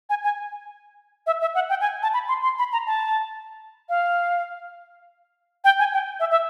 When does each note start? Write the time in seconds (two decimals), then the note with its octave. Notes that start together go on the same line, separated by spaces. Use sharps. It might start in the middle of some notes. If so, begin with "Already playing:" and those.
0.10 G#5
0.24 G#5
1.27 E5
1.41 E5
1.55 F#5
1.69 G5
1.81 G#5
2.03 A5
2.14 B5
2.28 C6
2.43 C6
2.58 B5
2.73 A#5
2.86 A5
3.89 F5
5.64 G5
5.79 G#5
5.94 G5
6.20 E5
6.31 E5